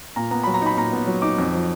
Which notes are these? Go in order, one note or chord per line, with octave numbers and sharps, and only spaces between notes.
A#2 A#5
B3 A#5
F#3 B5
A#5
D#4 B5
A#2 A#5
B3
F#3
D#4 D6
F2
F3